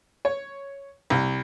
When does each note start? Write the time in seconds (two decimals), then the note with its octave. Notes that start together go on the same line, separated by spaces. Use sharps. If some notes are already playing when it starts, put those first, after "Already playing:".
0.25 C#5
1.10 C2